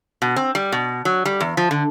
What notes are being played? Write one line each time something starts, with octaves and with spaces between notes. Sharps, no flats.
B2
C4
G3
B2
F#3
G3
E2
F3
D3